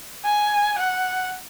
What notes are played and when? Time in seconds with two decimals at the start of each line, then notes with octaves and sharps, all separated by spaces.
0.25 G#5
0.78 F#5